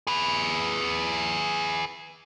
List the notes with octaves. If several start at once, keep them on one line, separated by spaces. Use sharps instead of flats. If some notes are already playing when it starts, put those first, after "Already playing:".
G#4 B4